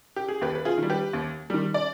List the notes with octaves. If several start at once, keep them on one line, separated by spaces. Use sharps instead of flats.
G4
G#4
D#2 G4 B4
B4
F4 G#4
D#3
G3
G4 B4
D#2
D#3 G3
D5